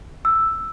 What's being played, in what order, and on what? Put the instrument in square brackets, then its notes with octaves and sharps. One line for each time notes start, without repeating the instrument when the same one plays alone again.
[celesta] E6